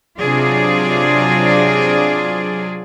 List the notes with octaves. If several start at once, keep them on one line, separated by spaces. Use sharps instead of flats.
C3 F#3 D4 F4 G#4 D5